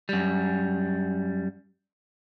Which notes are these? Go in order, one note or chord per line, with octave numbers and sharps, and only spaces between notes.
F#2 G3